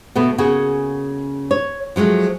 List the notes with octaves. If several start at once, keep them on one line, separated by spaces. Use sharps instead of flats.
B2 D3 A3 B3
C#3 A#3 F#4 G#4
C#5
F3 F#3 G#3 A3